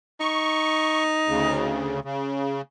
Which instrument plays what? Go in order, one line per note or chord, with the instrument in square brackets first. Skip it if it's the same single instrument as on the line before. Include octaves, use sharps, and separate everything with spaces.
[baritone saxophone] D#4 [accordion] C#6
[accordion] D2 C#3
C#3